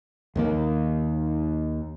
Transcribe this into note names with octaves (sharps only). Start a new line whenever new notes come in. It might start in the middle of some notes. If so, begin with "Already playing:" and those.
D#2 D#3 A#3